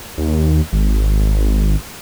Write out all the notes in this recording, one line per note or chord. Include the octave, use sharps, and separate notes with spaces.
D#2
G#1